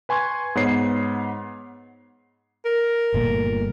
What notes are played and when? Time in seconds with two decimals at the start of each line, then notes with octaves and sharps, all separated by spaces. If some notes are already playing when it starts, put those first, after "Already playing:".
0.09 B4 G#5 C6 C#6 G#6
0.55 G#2 B3 C#5 C7
2.65 A#4
3.14 G1 A#2 A3